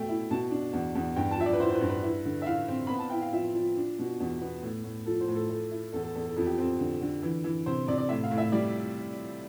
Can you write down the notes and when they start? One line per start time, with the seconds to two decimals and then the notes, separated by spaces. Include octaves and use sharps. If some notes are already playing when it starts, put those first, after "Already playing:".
Already playing: B2 A3 G5
0.09 E4
0.31 B2 A5
0.51 D4
0.73 E2
0.95 E2
1.16 G2 G5
1.31 A5
1.38 F3 E5
1.46 D5
1.53 B4
1.60 E4 C5
1.71 C5
1.75 B4
1.81 G2
1.90 B4
2.03 E4
2.25 D3
2.42 E5
2.46 E4 F5
2.68 C4
2.87 B3 B5
2.99 A5
3.10 E4 G5
3.22 F5
3.33 F3 E5
3.55 F3
3.77 D4
3.99 B2
4.20 E2
4.42 B3
4.63 A2
4.84 A2
5.06 F3 A4
5.21 C5
5.28 A2
5.35 A4
5.49 A3 A4
5.72 E4
5.93 E2 A4
6.03 A4
6.15 E2 A4
6.26 A4
6.37 F2 A4
6.46 G4
6.58 C4 A4
6.80 D3
7.02 D3
7.23 E3
7.44 E3
7.66 C3 C5
7.88 C3 D5
7.98 D5
8.09 A2 E5
8.23 F5
8.31 A2
8.38 E5
8.52 G3 D5